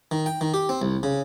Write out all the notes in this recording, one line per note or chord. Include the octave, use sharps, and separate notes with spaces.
D#3
G5
D#3
G4
C4
C2
C#3